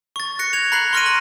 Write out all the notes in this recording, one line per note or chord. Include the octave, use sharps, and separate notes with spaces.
C#6 A6
F#6 A#6 C#7
G#6 F7
A#5 B5 F#6 C7 F#7
C6 C#6 F6 A#6 D7 D#7
C#6 A#6 F#7